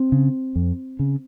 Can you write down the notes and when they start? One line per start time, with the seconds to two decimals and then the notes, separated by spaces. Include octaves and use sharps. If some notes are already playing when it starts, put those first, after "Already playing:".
Already playing: C4
0.12 C#3
0.56 F2
0.99 C#3